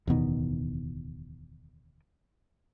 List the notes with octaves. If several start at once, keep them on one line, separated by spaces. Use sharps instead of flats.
D1 E2 B2 D#3